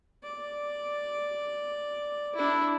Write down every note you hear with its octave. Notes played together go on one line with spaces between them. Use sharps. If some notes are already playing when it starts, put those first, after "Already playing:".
D5
D4 E4